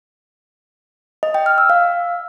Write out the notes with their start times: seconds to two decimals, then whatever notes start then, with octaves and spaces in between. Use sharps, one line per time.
1.23 D#5
1.34 G5
1.46 F6
1.58 E6
1.70 F5